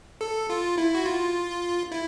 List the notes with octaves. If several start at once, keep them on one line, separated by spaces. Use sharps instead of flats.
A4
F4
E4
F#4
F4
E4